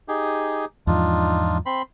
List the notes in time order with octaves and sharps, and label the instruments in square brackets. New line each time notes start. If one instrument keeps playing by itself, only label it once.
[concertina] D#4 G4 G#4
[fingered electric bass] E2 G#2 F3 [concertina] D4 D#4 F4
[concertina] C4 B5 C6